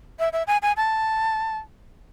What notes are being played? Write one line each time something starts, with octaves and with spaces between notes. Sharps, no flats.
E5
E5
G#5
G#5
A5